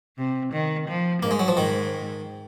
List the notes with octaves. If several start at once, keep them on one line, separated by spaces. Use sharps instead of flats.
C3
D#3
F3
G#2 A#3
G#3
F#3
F3
G#2 D#3